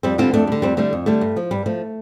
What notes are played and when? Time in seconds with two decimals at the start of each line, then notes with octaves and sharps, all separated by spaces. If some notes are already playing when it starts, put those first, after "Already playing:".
0.03 F2 G3 C4
0.18 D3 G3 C4 F4
0.33 F2 A3 D4
0.47 D3 G3
0.62 F2 G3 C4
0.77 D3 G3 A3
0.93 F2
1.06 D3 G3 A3
1.21 G2
1.36 F3
1.51 G2 G3
1.66 F3 A3